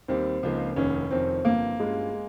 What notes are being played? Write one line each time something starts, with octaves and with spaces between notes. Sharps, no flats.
D#2 D#3 G3 C4
C#2 C#3 F3 A#3 D#4
F1 D#2 D#3 C#4
F1 F2 D#3 C4
G1 G2 F3 A#3 C4
G2 G3 G#3 C#4 F4
G#3